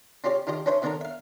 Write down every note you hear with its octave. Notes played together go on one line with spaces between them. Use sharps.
C4 C#4 F4 G4 D5
D#3 D4 F4 G4 D#5
C#4 D4 B4 C5 E5 B5
D#3 B3 C4 D4 A4 A#4
E5 F5